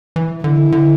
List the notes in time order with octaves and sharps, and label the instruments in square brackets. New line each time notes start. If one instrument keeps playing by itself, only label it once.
[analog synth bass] E3
[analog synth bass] D3 [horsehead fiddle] E4
[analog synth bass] D3